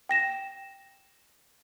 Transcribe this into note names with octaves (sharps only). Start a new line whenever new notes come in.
G5 A#6 E7